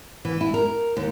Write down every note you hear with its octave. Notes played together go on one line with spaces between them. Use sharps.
E3
E4
A#4
D#2